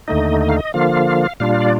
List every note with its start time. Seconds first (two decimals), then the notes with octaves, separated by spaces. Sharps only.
0.08 D#2 D3 A3 D#4 D#5
0.41 D#5
0.49 F5
0.56 D#5
0.74 D3 F3 A#3 F4 F5
1.40 A#2 G3 D4 F4 F5
1.61 D5